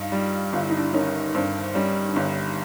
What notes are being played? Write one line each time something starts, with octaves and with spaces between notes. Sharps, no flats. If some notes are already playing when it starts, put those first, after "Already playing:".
Already playing: G2 D#4 F4
G3
G1 F4
E4
D#4
D4 E4
D#3 C#4 D#4
G2 C4 D4
G3 C#4 D#4
D4
G1 C#4 D#4